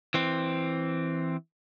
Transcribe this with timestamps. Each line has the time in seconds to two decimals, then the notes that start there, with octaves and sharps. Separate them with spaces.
0.14 E3 C4